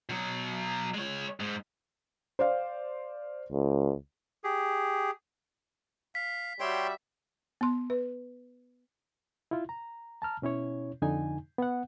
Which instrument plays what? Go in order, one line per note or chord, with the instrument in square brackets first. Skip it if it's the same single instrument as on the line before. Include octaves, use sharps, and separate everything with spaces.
[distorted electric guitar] B2 F#3
G#3 C#5
G#2 G#3
[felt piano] C5 D5 F5
[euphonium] C#2
[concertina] G4 G#4
[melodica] F5 [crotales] B6
[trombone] G3 [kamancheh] F#4 E5 [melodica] C#5 G5 C6
[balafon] B3 C6
B4
[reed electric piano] E4 F4
A#5
A5 A#5 F6
B2 C#4 E4 C#5
F2 D3 D#4 G#5
B3 F#5